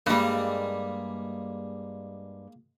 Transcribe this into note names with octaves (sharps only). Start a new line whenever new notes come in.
G2 G3 G#3 A#3